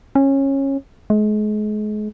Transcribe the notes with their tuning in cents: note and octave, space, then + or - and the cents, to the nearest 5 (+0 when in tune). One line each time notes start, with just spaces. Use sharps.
C#4 -20
G#3 +35